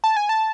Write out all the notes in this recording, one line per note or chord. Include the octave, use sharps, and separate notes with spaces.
A5
G#5
A5